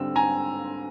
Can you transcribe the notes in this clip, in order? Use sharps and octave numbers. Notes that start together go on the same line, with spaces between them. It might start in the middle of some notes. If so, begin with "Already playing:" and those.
Already playing: D3 G3 C4 E6
G#5 A#5